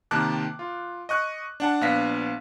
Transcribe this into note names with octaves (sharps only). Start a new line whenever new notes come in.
C3 D#3 A#3 A5 D6 F#6
F4
D#5 C#6 F#6
D4 F#5 A5
A#1 B3 D4 F5 A#6 B6